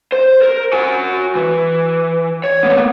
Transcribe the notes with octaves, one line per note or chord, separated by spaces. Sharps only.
C5
A#4
F#4 G#5
E3
C#5
A#3 B3